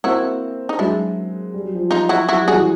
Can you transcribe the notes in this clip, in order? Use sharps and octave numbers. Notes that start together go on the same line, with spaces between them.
A#3 C4 E4 F#4
D#4
F#3 G#3 D4 E4
G3
F#3
F3 G3
D#4 F4
E4 F#4
F#3 E4 F#4
G3
F#4 G#4
E3 F#3